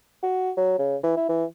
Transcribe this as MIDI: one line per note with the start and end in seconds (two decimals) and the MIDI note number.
0.23 0.51 66
0.57 0.74 54
0.79 0.96 49
1.03 1.12 52
1.17 1.29 64
1.29 1.44 52